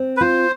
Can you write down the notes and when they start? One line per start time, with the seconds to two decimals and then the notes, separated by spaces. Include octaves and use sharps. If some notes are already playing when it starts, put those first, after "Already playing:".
Already playing: C4
0.17 B4
0.20 F4 C5